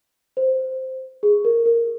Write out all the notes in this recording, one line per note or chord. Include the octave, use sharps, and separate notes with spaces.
C5
G#4
A#4
A#4